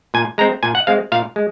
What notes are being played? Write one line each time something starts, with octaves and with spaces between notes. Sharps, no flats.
A#2 G#5
G#3 C4 A#5
A#2 G#5
F#5
G#3 C4 F5
A#2 F5
G#3